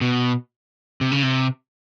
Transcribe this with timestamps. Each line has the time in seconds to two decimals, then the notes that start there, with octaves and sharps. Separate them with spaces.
0.01 B2
1.01 C3
1.11 C#3
1.23 C3